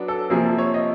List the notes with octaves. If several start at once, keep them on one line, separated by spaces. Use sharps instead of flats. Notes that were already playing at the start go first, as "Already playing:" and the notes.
Already playing: F#3 B3 D4
A4
C3 F3 A#3 G#4
A4
C#5
D#5